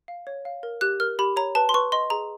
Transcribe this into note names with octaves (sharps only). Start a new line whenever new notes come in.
F5
C#5
F5
A#4
G4 F#6
A#4 F6
G4 B5
C#5 A#5
B4 A5
C6
B4 C#6
D#5 C6
G#4 A#5